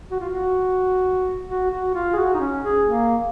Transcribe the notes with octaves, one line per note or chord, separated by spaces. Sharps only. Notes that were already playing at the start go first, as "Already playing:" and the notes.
F#4
F4
F#4
F#4
F#4
F4
G#4
F#4
D#4
C#4
G#4
A#3